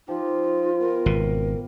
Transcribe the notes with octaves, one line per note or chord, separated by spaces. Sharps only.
F3 D#4 F4 G4
B3 A#4
G#1 B2